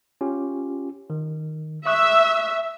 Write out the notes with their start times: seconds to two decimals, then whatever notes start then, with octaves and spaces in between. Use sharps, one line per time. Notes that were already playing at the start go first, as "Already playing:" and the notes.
0.21 C#4 F4 G4
1.10 D#3
1.86 E5 C#6 D#6 F#6